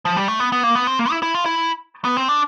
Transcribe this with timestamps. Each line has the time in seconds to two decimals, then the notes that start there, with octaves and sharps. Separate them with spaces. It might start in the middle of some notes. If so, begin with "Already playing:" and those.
0.05 F3
0.16 G3
0.28 A3
0.40 B3
0.52 B3
0.63 A#3
0.75 B3
0.87 C4
0.99 A#3
1.11 E4
1.22 E4
1.34 F4
1.46 E4
2.05 B3
2.17 C4
2.29 D4